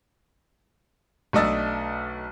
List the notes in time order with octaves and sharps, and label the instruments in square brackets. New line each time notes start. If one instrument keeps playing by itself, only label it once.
[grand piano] B1 A3 D4 D#5 E6 A6